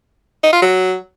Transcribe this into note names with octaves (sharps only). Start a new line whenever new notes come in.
D#4
F4
F#3